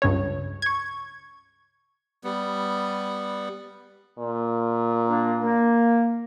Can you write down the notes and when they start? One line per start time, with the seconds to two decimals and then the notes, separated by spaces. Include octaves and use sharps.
0.02 C#2 G2 C#3 C#5
0.62 C#6 G#6
2.24 G3 B3
4.18 A#2
5.08 A#3 D4
5.40 A#3